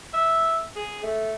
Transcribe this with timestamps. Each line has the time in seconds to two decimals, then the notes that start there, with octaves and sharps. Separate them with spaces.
0.14 E5
0.76 G#4
1.03 A3